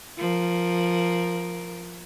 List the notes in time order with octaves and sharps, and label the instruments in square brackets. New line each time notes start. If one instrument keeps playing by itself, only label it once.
[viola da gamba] F3 A#4